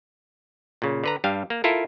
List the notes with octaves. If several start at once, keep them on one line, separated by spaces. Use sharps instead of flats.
A#2 C#3
D3 B4 A#5
G2 G3 F5
A#3
E4 F4 A4 A#4